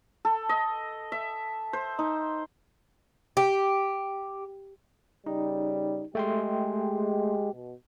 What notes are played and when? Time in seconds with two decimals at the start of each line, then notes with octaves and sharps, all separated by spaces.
0.25 A4
0.49 D#5
1.12 E5
1.73 C5
1.99 D#4
3.37 G4
5.26 C#3 G3 D#4
6.15 G#3 A3 G4 G5 C6
7.53 B2